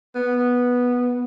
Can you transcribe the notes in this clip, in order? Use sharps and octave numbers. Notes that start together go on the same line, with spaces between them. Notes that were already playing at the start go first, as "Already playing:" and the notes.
B3